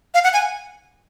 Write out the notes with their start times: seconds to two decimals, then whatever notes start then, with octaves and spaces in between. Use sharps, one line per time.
0.14 F5
0.24 F#5
0.33 G#5